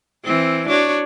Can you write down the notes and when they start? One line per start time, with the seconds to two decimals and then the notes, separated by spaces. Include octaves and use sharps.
0.25 E3 C4
0.68 D4 F#4 C#5